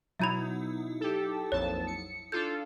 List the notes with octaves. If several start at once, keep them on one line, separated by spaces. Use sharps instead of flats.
B2 F#3 D#4 E4 E5 A#5 B5
G4 A4
A#1 F2 C#5 A5
C#7
D4 F4 A4 G6